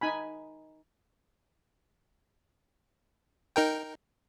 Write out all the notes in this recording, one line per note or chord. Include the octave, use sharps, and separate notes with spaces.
D#4 G#5 B5
D#4 A#4 G5